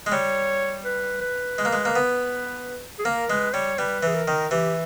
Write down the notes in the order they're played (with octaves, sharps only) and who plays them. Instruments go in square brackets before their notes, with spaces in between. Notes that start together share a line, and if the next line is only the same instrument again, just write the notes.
[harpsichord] G#3
[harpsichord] G3 [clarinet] C#5
[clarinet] B4
B4
[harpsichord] G#3
A#3
G#3
A#3
B3
[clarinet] G#4
[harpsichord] A#3 [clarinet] A#4
[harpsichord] G#3 [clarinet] B4
[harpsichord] G3 [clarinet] C#5
[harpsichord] G3 [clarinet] B4
[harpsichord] E3 [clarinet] G#4
[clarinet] A#4
[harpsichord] D#3
[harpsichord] E3 [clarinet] G4